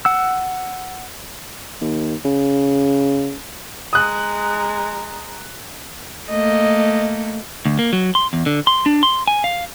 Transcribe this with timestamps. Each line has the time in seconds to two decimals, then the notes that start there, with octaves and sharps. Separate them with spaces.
0.05 F#5 E6
1.81 D#2
2.25 C#3
3.93 G#3 A#5 D#6 F#6
6.30 A3 A#3 D#5
7.65 D2
7.79 A#3
7.93 F#3
8.15 C6
8.33 E2
8.46 D3
8.67 C6
8.86 D4
9.03 C6
9.27 G#5
9.44 F5